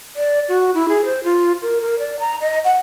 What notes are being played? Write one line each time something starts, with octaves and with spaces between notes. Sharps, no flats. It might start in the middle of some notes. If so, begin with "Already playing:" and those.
D5
F#4
E4
G#4
C5
F4
A#4
A#4
D5
A#5
D#5
F#5